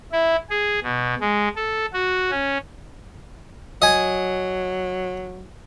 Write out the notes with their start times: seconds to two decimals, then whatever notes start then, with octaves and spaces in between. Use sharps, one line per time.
0.12 E4
0.50 G#4
0.83 B2
1.20 G#3
1.56 A4
1.93 F#4
2.31 C#4
3.82 F#3 D#5 G#5